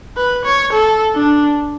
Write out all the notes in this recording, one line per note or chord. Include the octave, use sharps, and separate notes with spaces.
B4
C#5
A4
D4